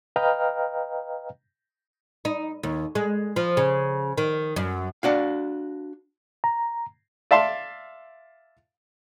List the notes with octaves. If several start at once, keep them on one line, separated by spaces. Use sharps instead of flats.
B4 D#5 F5 G5 A#5 F6
D#4
D#2
G#3
F3
C#3
D#3
F#2
D4 F#4 F5
A#5
D5 E5 F5 A5 C6